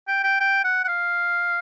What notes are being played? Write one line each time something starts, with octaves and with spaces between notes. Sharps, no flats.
G5
G5
G5
F#5
F#5
F5